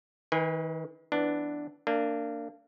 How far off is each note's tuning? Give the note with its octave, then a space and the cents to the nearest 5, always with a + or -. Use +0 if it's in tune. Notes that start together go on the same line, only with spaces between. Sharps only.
D#3 +40 B4 +5 G#5 -30
E3 +0 B3 +0 D4 +0
A#3 -25 D4 +0